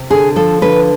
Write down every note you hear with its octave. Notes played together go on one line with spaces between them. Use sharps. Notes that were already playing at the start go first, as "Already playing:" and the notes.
Already playing: C3
D3 G#4
F3 A4
D3 B4